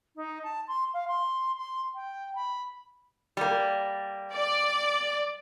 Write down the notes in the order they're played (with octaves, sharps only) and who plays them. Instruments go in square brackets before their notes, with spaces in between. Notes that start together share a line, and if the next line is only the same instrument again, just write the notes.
[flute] D#4
A5
C6
F5
C6
C6
G5
B5
[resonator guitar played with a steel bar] G3 A#3
[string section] D5